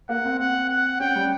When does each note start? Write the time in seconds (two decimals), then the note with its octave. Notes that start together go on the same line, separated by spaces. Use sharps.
0.09 A#3 F#5
0.25 C4
0.39 F#5
0.69 F#5
1.00 C#4 G5
1.15 G3